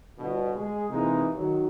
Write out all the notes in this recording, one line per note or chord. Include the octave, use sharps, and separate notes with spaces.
G1 B2
G#3 G#4
C3 E3 G#3 A#3 D#4
D#3 F#3